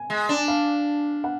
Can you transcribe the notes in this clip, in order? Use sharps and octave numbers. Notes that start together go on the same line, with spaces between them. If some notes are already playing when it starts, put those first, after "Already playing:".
Already playing: G#5
G#3
D4
F5
F#5